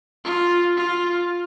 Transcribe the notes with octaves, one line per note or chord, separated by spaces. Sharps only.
F4
F4